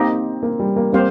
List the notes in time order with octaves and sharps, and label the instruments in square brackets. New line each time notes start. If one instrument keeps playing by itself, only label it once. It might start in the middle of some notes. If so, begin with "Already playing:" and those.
Already playing: [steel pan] A#3 D#4 G4 [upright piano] C4
[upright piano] A#3
G3
A#3
[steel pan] G3 C4 G4 C5 F5 [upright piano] A#3